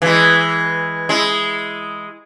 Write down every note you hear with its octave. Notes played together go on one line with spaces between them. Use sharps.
E3 G#3
G#3 E4